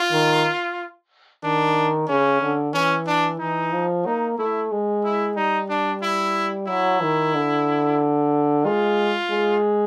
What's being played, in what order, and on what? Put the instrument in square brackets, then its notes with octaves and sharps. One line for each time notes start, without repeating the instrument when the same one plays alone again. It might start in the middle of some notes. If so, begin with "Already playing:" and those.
Already playing: [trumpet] F4
[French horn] D#3
[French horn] D#3 [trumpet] D4
[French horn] C#3 [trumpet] C#4
[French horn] D3
[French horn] E3 [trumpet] C#4
[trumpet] D4
[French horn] E3 [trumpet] D#4
[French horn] F3
[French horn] A#3 [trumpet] D#4
[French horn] A3 [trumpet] E4
[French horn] G#3
[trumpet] E4
[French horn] G3 [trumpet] D#4
[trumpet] D4
E4
[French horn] F#3 [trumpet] E4
[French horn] D#3
D3
[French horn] G#3 [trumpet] F4
[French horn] G#3